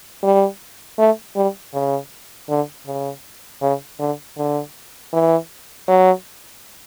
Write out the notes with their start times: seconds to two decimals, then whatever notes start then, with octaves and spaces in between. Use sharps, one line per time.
0.23 G3
0.98 A3
1.36 G3
1.74 C#3
2.49 D3
2.87 C#3
3.62 C#3
4.00 D3
4.38 D3
5.13 E3
5.88 F#3